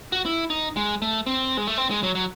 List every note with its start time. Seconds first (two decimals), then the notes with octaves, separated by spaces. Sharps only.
0.12 F#4
0.26 E4
0.50 D#4
0.76 G#3
1.02 A3
1.26 C4
1.57 G#3
1.67 A3
1.78 C4
1.90 G#3
2.03 F#3
2.15 F#3